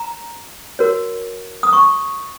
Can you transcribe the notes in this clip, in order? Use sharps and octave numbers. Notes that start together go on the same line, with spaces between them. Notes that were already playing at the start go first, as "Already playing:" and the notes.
Already playing: A#5
F#4 A#4 C#5
D#6
C#6